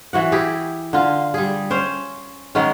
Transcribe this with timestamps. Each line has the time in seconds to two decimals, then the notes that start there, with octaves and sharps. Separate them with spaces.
0.13 E3 F#4 F#5
0.32 E4 G4 G#4
0.93 D3 F4
1.34 G3 G#4
1.71 C#4 C5
2.55 D#3 G#3 B3 C#4